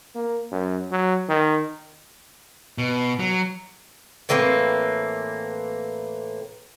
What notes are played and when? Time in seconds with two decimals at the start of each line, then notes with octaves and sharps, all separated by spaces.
0.15 A#3
0.52 F#2
0.91 F#3
1.29 D#3
2.78 B2
3.20 F#3
4.29 A2 E3 A#3 C4